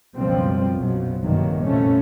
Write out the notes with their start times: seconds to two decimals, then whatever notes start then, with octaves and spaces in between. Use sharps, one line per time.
0.16 C#2 F#2 B2 F3 G3 C4
0.75 F#1 B1 B2 F3 F#3
1.22 A#1 G2 C3 D#3 F#3 A#3
1.65 A#1 F2 A2 C3 A3 C#4